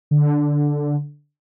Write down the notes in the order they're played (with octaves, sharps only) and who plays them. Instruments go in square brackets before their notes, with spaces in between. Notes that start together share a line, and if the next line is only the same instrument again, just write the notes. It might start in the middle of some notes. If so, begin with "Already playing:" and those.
[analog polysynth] D3